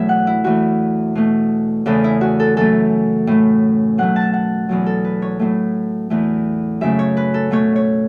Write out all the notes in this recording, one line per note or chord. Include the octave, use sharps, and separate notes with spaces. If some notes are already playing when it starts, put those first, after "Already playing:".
Already playing: E2 B2 F#3 A3 C#5 E5
F#5
E4
E2 E3 A3 F#4
B2 A3
E2 C#3 E3 A3 A4
E4
F#4
A4
F#2 E3 A3 A4
A2 A3
B2 F#3 A3 F#5
A5
F#5
E2 B2 F#3
A4
B4
C#5
A2 F#3 A3
E2 E3 A3
F#2 C#3 A3 E5
C#5
B4
A4
B2 A3 C#5
C#5